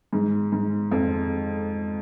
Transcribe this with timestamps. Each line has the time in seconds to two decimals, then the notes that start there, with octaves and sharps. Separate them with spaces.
0.13 G#2
0.52 G#2
0.91 F2